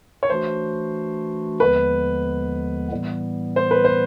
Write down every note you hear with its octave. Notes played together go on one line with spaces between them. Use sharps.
C#5
E3 A3 D4 F#4 C5
D#2 D3 F3 G#3 B3 B4
A2 E3 G3 B3
C5
B4
C5